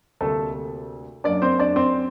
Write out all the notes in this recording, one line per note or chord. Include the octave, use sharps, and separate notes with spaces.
D2 C3 G3 A3 A#3 A4
F#2 F#3 A#3 D4 D5
C4 C5
D4 D5
C4 C5